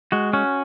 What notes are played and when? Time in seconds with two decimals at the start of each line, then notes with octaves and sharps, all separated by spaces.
0.12 G#3 F#4
0.33 C#4 F#4